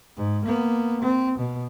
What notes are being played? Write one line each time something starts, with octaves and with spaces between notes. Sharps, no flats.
G#2
A#3 B3
C4
B2